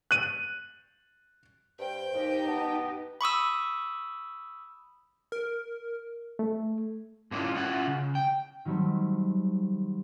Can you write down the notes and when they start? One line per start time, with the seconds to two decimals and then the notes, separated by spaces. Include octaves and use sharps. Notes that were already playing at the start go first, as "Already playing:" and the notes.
0.11 F#6 D#7
1.79 G2 C5 G5
2.13 D#2 D#4 G4 D#5
2.47 B3 A5
3.21 B5 C#6 D#6 E6
5.32 A#4
6.39 A3
7.31 G#2 A#3 C#4 D4 E4 F4
7.54 C#4 E4 F4 F#5
7.86 C#3
8.15 G5
8.65 D#3 F#3 G3 A3 C4